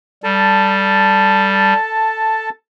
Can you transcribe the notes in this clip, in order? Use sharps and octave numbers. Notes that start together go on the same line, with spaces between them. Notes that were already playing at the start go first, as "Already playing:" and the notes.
G3 A4 A5